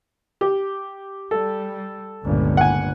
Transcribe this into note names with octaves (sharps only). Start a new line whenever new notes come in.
G4
G3 A4
G1 C#2 A#2
F#5 G#5